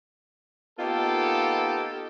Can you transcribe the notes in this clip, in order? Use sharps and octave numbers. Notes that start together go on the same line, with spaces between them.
A#3 B3 D#4 F4 G4 A4